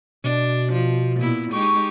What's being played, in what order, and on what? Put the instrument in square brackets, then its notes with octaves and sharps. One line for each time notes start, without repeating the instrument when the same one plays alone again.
[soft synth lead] B2 [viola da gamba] D4
[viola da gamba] F3
A#2 B3 E4
[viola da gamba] G#3 D#4 G4 [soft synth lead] C#6